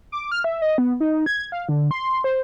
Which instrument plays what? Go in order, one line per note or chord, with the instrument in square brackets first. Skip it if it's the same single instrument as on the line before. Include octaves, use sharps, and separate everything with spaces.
[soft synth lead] D6
F6
E5
D#5
B3
D#4
G#6
F5
D3
C6
C5